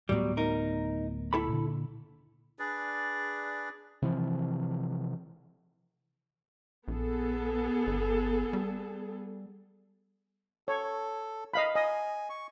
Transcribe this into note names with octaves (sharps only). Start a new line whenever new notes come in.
D1 A2 F#3 G3 B3
D#4 A#4
E4 A4 B5
A#2 D3
D4 G#4 B4 D5
C3 E3 F3
A#1 B3 G#4 A4
G1
G3
A4 C#5
D#5 F5 B5
D#5 G#5
C#6